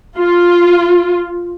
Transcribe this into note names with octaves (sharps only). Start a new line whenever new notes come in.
F4